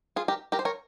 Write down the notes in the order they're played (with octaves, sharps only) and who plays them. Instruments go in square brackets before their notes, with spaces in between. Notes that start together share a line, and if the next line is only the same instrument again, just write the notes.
[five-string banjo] F4 G#4
G4 A#4
G4 A#4
C5
A#4 C#5